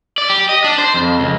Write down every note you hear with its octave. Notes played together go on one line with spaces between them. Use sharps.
D5
G4
D#5
D4
C5
F2
C#2